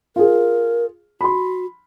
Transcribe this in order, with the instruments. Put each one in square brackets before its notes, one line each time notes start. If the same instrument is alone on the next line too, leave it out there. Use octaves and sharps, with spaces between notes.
[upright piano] F4 G#4 [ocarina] A#4
[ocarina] F#4 [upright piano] B5 C6